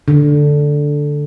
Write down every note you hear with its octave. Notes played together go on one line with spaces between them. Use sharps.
D3